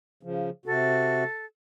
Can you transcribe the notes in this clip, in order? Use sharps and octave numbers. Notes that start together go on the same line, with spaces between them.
C#3 F3
C3 F#4 A4